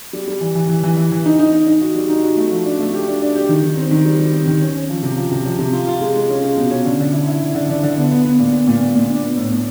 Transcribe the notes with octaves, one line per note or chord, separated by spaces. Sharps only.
G3
G3
E3
E3
E3
E3
E3
E3
D#4
D#4
D#4
D#4
F#4
G3
D#4
F#4
A3
F3
D4
A3
G4
D4
D4
G4
D#3
D#3
C4
D#3
G3
G3
C4
D#3
C#4
C#4
F3
C3
F3
C3
F3
C3
F4
F4
G#3
G#3
C#4
G#3
B2
C#4
D3
D3
E4
E4
D3
D3
D3
D3
B3
B3
B3
A#2
B3
A#2
A#2
A#2
D4
B3
A2
A2